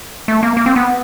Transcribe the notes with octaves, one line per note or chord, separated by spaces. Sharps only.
A3
A#3
A#3
C4
B3